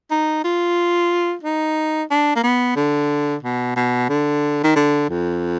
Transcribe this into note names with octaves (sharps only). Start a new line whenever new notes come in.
D#4
F4
D#4
D4
A#3
B3
D3
B2
B2
D3
D#3
D3
F2